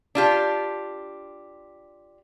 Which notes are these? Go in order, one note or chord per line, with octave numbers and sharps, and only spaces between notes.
D4 F4 G4